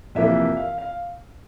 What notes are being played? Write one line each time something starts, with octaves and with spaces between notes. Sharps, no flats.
F2 C3 E3 A#3 E5
F5
F5